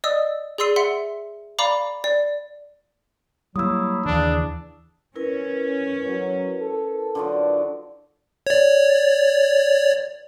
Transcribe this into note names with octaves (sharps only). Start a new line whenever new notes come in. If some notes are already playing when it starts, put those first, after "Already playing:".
D5 D#5 D#6 E6
G#4 D5 C6 E6 C7 D#7
E5 F#5 C6 C#7
D5 F5 A#5 B5 D6
D5
F#3 G3 A#3 E4 D#6 E6
D#2 C#3 E3 D4
C#4 E4 A#4 B4
F#3
A4
D3 F3 F#3
C#5 D5